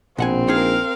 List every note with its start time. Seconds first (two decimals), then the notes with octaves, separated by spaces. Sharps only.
0.18 A#1 B2 C4 F#5 G#5
0.48 D#4 G#4 A#4 F5